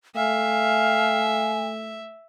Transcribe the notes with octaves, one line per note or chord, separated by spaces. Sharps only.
A3 E5 F5 G#5